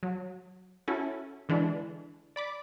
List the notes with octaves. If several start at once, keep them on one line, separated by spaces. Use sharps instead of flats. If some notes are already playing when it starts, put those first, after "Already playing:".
F#3
C#4 E4 F#4 A4
D3 E3 G#3 D4
D5 B5 D6